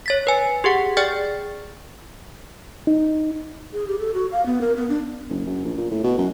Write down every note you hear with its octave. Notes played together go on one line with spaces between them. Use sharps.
C#5 A6 B6
B4 G#5
G4 G#4 F#5
G#4 D5 G5 F6 A6
D#4
G#4
G4
A4
F#4
F5
B3
A#4
B3
D4
F#1
F#2
A#1
A#2
A2
B2
F#2